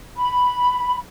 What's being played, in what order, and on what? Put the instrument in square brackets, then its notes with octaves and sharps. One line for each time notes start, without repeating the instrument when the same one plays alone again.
[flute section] B5